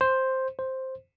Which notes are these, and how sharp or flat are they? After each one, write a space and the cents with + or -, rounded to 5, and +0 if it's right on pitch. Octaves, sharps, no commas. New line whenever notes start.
C5 +5
C5 +5